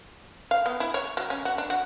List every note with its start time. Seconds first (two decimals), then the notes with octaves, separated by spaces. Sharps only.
0.51 F5
0.66 B3
0.80 E4
0.94 C#5
1.17 F#3
1.30 C#4
1.45 F#4
1.58 D4
1.70 F#4